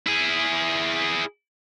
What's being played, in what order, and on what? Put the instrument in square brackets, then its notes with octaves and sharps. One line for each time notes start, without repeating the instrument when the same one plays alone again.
[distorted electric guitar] E4 G#4